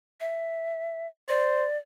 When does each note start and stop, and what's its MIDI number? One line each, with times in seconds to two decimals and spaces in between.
0.20 1.07 76
1.29 1.66 72
1.29 1.78 74